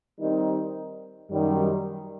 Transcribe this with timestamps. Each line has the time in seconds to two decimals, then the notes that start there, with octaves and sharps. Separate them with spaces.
0.19 D#3 G3 C4 D#4
1.30 F#2 D#3 G3